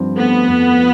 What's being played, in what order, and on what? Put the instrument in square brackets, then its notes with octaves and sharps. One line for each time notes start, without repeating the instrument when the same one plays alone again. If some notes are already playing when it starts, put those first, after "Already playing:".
Already playing: [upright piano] G2 F3 C4
[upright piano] A3 [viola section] B3
[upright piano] F2
F3